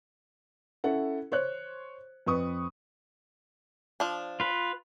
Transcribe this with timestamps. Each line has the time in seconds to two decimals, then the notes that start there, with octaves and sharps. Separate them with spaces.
0.84 C#4 E4 A4 F#5
1.32 C5 C#5 F#6
2.26 F2 B4 C#6 D#6
4.00 F3 D4
4.40 F4 B4